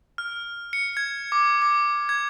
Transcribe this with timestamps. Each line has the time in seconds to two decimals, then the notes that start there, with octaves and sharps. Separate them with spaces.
0.18 F6
0.73 C#7
0.97 G#6
1.32 D6
1.62 D6
2.09 G#6